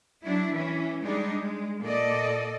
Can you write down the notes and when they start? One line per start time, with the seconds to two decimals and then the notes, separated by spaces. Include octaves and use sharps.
0.24 F#3 D4 E4
0.54 E3 C#4
1.03 G3 G#3 D4 D#4
1.42 G#3
1.82 A#2 A4 D5 D#5